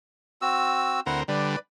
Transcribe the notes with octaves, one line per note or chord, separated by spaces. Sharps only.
C4 F#4 E6
D2 C4 E4 A#4 F#5
D3 G3 B4 D5